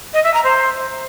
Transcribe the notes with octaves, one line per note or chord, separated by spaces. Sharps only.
D#5
E5
A#5
C5